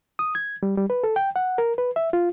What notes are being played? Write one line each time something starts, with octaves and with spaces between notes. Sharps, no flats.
D#6
G#6
G3
G3
B4
A4
G5
F#5
A#4
B4
E5
F4